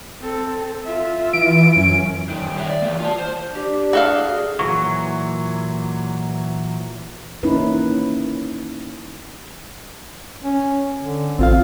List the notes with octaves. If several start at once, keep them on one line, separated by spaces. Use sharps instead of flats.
C4 A4
F4 E5
E3 D7
F#2 C#4
A#2 D#3
C#5 E5
D5
E3 A#3
F4 A5
C5
D4 G4
F#4 G#4 A4 F5
A#2 E3 F#3 C#6
A#3 C#4 D#4 E4 B4
C#4
D3
A1 C4 F4 F5